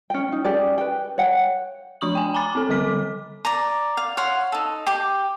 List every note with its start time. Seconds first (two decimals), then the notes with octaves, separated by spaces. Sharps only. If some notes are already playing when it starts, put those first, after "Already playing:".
0.10 C#4 G5
0.32 D#4
0.45 C#4 G4 G#4 D5
0.78 B4 G5
1.18 C#5 F#5 G5
2.01 F3 D4 C#6 D#6 F#7
2.15 G5 G#5
2.34 G#5 A#5 B5 D6 A6
2.55 C4 A4
2.69 D3 G3 A4 D6 B6
3.45 D5 A#5
3.97 F5
4.17 C#5 F5 F#5 C6
4.52 D#4 A4
4.87 G4 G5 D6